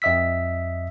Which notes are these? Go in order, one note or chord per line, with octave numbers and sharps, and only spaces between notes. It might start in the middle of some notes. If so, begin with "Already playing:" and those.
F2 D#5 E5 E6 B6